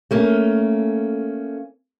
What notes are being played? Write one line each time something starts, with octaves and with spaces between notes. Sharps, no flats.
A3 A#3 C#4